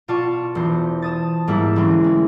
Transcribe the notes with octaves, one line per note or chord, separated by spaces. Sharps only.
B2 F4 D5 A5 C#6
E1 C5
A5 D#6 A6
G#2 G3 A#3 B3 E4
D3 E3 A#3 C4 C#4
G#3